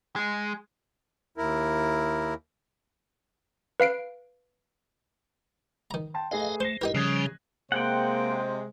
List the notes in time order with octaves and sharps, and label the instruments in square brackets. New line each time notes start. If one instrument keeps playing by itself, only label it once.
[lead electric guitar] G#3
[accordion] D#2 E4 A#4
[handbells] B4 F5 C7 D7
[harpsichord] D#3 A#5
[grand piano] G5 A5 C6
[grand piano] A3 G#4 B4 [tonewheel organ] D#5 F5
[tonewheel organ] A3 [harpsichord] C5 [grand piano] A#6 C7 G7
[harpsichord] D#4 G4 A#4 [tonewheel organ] E4 B4
[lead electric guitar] C#3 [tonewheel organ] F3 G3 [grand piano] D#6 F#6 G#6
[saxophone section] C3 G#3 [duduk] A#3 [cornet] C5 [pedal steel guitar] F#5 G5